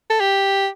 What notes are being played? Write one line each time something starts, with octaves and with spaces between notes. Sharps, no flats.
A4
G4